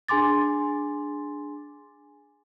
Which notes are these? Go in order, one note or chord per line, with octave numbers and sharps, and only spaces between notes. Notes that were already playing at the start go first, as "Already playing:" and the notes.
D4 G#4 G#5 C6 D6 A6